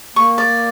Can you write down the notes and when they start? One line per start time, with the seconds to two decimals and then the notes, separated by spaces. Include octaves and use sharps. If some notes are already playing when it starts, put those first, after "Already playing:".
0.16 A#3 C#6
0.38 D5